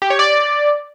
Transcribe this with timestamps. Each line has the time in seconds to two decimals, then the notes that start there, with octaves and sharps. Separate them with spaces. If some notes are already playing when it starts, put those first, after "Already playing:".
0.02 G4
0.10 C#5
0.19 D5